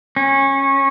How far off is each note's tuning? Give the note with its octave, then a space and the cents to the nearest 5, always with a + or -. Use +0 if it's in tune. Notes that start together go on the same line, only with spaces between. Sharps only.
C#4 -20